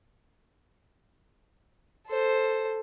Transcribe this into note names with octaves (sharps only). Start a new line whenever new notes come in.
A4 C5